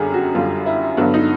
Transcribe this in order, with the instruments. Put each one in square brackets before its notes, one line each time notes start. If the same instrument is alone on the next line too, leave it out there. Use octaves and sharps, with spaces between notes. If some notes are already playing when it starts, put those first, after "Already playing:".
Already playing: [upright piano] F#2 D3 G3 G4 G#4
F#4
F#2 D3 G3 F4
E4
G2 D3 F#3 B3 D4
D#4